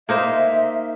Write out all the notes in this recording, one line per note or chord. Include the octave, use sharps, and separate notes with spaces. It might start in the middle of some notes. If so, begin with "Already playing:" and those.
A#3 D#4 C5 E5